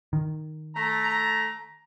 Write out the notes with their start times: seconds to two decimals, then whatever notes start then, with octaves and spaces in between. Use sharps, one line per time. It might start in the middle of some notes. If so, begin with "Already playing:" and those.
0.13 D#3
0.76 A3 A4 A#5